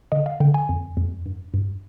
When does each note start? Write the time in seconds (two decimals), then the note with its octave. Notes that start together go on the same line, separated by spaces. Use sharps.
0.12 D3 D#5
0.26 F5
0.40 D3 G5
0.54 G#5
0.69 F2
0.97 F2
1.26 G2
1.54 G2